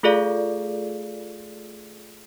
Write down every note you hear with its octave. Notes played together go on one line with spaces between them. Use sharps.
A3 F4 G#4 A4 D5 F5